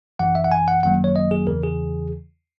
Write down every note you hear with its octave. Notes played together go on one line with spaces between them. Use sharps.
G#1 F#2 E3 F#5
E5
F#5
G#5
F#5
G#1 F#2 D#3 F#3 A#3 F#5
C#5
D#5
G#4
E2 C#3 E3 A#4
G#4